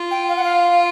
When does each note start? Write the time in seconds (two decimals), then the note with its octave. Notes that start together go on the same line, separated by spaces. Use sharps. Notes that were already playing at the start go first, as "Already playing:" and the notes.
Already playing: F4
0.11 G5
0.29 F5
0.37 F#5
0.44 F5